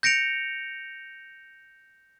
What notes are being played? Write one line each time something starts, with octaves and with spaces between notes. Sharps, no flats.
G6 A#6 C#7 D7 F7